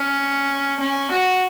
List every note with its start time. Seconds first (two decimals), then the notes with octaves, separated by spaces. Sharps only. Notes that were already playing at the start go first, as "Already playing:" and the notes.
Already playing: C#4
0.80 C#4
1.11 F#4